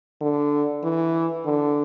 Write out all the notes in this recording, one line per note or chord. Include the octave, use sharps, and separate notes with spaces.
D3
E3
D3